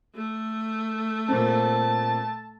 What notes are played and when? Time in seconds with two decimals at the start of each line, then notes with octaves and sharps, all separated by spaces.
0.15 A3
1.28 A#2 C4 A5